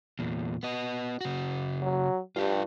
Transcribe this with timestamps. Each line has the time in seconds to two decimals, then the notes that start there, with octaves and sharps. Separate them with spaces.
0.19 E2 A#2
0.63 B3 D#5
1.21 C#3 F#4
1.83 F#3
2.36 G2 F4 G4